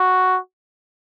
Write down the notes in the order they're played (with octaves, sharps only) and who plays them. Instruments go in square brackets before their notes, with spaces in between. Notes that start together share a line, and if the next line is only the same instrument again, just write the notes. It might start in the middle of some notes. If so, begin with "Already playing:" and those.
Already playing: [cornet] F#4